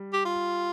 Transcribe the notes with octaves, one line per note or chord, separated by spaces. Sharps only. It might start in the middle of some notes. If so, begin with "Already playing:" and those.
Already playing: G3
G4
F4